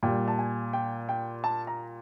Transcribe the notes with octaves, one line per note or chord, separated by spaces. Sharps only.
A#2 G3 G5
A5
G#5
G5
G5
A5
A#5